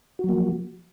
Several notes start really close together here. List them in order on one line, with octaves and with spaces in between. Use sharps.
F#4 F#3 A#3 F3